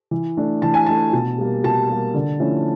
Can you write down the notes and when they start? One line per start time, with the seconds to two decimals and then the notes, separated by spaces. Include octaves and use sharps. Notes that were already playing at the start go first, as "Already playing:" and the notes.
0.11 E3
0.37 A3 D4
0.62 E3 A5
0.74 G#5
0.86 A3 D4 A5
1.13 B2
1.38 G3 A#3
1.64 B2 A5
1.89 G3 A#3
2.14 D3
2.39 F3 A3 C#4 E4